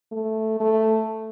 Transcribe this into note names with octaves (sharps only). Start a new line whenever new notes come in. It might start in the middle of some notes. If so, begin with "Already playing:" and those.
A3
A3